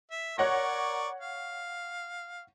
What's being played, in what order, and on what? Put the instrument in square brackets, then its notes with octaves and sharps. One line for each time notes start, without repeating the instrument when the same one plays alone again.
[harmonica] E5
[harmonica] A#4 D5 C#6 [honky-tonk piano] C#5 F#5 A#6
[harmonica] F5